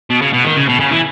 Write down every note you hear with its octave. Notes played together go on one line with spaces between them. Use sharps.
B2
C#3
B2
D#3
C#3
B2
C#3
E3